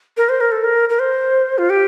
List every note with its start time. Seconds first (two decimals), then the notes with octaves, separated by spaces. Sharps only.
0.17 A#4
0.29 C5
0.41 A#4
0.52 A4
0.64 A#4
0.89 A#4
0.99 C5
1.58 F4
1.70 G4